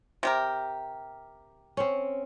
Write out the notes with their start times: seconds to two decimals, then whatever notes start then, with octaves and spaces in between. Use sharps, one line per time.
0.23 C3 G4 A#4
1.77 C4 C#4